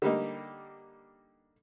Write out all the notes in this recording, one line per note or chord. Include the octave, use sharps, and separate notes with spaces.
D3 G3 A#3 D#4